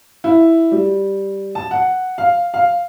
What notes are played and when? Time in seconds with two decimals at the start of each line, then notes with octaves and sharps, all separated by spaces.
0.24 E4
0.72 G3
1.55 A5
1.71 F#5
2.18 F5
2.54 F5